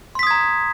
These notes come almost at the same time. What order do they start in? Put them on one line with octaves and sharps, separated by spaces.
C6 B6 D#6 G#6 A#5